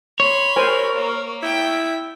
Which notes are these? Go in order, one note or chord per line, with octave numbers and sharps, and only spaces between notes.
C#5 B5 C6
A#4 C5 G#5
A#3
E4 G5 B6